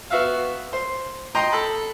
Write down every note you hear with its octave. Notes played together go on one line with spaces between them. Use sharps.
B3 F#4 E5 F5
C5
D#5 G5 A#5 C6 D#6
A4 B5